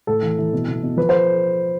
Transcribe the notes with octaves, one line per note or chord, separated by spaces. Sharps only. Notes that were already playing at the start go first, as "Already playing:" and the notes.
A2 A4
E3
E3
B2
B2
B2
F3 B4
C5